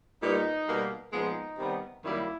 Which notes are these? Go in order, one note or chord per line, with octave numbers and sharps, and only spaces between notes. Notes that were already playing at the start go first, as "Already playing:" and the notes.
A#2 G3 B3 D#4
B2 G3 A#3
A#2 F3 G#3 B3 D#4
C3 D#3 G3 B3
F#2 D#3 G3 A#3 E4